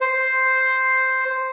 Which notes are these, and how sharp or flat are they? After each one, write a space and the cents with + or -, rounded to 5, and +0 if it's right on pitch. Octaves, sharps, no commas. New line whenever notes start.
C5 +0